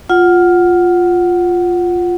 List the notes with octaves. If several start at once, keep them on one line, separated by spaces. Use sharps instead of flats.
F4 F#5